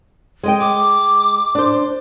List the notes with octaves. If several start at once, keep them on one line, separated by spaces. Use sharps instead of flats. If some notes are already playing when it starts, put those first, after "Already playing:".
G#3 D#5 G5
D6
D4 C5